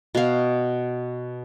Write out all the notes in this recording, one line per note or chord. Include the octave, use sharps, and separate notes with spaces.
B2 F5